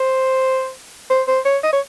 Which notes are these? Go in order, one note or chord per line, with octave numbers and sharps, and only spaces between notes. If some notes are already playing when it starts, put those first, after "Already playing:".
Already playing: C5
C5
C5
C#5
D#5
C#5